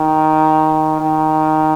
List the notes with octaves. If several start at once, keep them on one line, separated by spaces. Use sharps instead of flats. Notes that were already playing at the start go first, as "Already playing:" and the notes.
Already playing: D#3
D#3